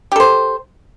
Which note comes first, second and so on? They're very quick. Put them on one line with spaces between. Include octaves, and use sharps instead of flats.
G4 A4 C5